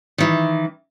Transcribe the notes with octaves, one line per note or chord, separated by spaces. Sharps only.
D#3 E3